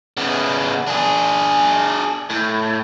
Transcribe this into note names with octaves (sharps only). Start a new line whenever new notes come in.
C#3 B3
D4 G#4
A2